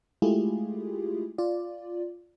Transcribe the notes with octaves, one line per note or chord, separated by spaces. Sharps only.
G#3 A3 E4 F4 G4 G#4
F4 D5